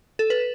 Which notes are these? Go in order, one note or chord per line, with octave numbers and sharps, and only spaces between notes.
A4
B4